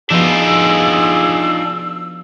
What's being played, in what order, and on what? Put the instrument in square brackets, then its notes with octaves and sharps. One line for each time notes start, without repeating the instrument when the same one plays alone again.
[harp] F3 B3 F#4 [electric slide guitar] D4 D#4 F4 [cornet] G#4 [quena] E6